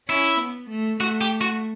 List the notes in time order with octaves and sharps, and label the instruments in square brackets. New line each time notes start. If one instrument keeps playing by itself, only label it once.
[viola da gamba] C#4 [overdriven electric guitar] E4
[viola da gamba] B3
A3
[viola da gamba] A3 [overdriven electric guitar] F#4
[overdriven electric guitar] G4
F#4